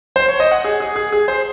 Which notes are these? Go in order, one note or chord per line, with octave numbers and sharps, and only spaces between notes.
C5
C#5
D#5
F#5
G#4
G#4
G#4
G#4
C5